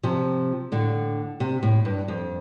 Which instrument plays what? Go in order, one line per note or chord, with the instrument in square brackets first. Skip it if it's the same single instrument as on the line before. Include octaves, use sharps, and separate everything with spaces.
[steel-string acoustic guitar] C3 F3
A2 D3
C3
A2
G2
F2